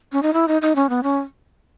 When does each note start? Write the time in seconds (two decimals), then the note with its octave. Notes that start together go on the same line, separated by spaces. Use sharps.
0.12 C#4
0.23 D#4
0.34 E4
0.48 D#4
0.62 D#4
0.76 C#4
0.89 B3
1.03 C#4